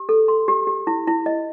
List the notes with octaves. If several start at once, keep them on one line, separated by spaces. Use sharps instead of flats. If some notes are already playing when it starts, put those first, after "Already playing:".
Already playing: G4
A4
C6
G4
G4
E4
E4
D#5